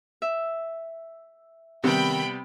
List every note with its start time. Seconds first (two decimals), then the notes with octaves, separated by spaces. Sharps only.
0.22 E5
1.84 C3 D#3 G3 B3 C4 G5 B5